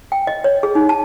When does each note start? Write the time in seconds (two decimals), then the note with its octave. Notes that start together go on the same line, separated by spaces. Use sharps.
0.12 G5
0.27 D#5
0.44 C#5
0.63 G#4
0.75 D#4
0.89 A5